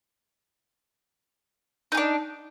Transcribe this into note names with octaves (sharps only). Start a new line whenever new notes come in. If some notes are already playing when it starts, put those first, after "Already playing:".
D4 D#4 G#4